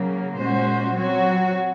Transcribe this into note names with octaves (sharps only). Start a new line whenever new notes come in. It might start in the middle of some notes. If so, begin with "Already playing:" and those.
Already playing: C#3 F#3 A#3
A#2 G#3 C#4 F#4 C5
F#3 C4 F#4 C#5